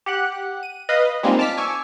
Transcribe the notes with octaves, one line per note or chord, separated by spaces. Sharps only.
G4 F#5 F#6
D#7
B4 D#5 F5 B5 D#6
G3 G#3 A#3 C4 D#4 F4
A5 D6 F6 B6
G#5 C#6 D6 E6